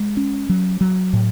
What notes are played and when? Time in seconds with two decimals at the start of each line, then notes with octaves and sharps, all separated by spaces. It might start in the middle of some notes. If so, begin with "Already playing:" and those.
Already playing: G#3
0.17 C#4
0.49 F#3
0.81 F#3
1.13 A2